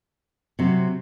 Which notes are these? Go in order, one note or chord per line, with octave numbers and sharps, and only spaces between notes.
C3 F#3 C4